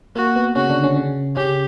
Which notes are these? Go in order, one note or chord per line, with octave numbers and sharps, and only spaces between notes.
A#3 F#4
B3
C#3 C#4 F#4
D3 D4
C#3 C#4
C#3 C#4
C#3 C#4 G4